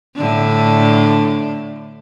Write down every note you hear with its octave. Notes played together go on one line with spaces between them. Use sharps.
A2 D3 D4